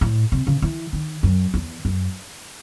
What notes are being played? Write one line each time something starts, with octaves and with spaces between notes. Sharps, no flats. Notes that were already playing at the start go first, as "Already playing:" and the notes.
A2
C3
C#3
E3
D#3
F#2
E2
F#2